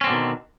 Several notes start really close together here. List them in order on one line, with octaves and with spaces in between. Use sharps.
C#4 C4 D3 B2 D#3